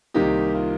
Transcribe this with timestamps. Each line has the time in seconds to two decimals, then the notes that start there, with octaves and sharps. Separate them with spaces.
0.14 C2 C3 D#3 A#3 D#4 G4
0.55 F4